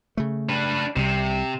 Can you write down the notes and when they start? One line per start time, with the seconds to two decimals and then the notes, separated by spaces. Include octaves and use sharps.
0.17 C#3 A3
0.49 D4 B4
0.96 C2 C3 G3